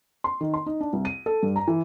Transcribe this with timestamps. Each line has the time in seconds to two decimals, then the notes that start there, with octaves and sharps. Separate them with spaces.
0.24 C6
0.41 D#3
0.54 C6
0.66 D#4
0.81 D4
0.93 C2
1.05 D#7
1.26 A4
1.43 G2
1.56 A#5
1.68 E3